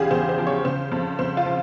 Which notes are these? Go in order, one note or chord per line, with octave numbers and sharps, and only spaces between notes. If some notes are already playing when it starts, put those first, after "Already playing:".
Already playing: E2 C#3 F4 G4 G#4
E2 C5
C5
F3
C#5
C#3 C5
F2
F2 C5
F4
F3